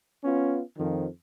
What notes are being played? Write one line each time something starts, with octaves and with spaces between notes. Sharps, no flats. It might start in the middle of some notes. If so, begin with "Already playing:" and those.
B3 C#4 F4
F2 D#3 F3